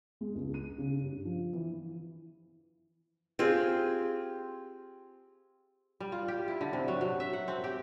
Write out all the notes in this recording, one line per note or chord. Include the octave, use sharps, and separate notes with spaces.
G#3
C#2
D#7
C#3
G2
F3
E3
C4 F4 G4 G#4
G3
F4
G4
E4
D3
C3
F#3
F#3
E5
F#5
C4
G4